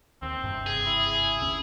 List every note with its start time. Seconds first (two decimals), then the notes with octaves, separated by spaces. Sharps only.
0.22 D#2 C4
0.43 F#1 G2 C3
0.66 G#4
0.86 E4
1.39 G1 D2 C#4